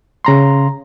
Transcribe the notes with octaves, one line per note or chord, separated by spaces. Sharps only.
C#3 A#5 C6